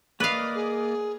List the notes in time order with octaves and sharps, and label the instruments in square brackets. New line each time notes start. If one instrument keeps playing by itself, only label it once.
[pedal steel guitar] A#3 D5 D#5 [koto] B4 F5
[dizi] G#4